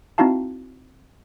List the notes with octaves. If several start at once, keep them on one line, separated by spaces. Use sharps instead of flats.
C4 D#4 E4 F#4 F5 A5